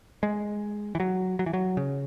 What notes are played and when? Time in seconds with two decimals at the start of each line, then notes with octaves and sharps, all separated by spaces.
0.23 G#3
0.95 E3
1.00 F#3
1.39 F#3
1.46 E3
1.53 F#3
1.77 C#3